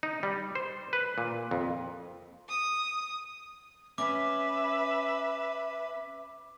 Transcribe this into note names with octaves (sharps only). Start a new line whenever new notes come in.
D#4
G3
C5
B4
A#2
F2
D#6
C#4 B4 E5 D6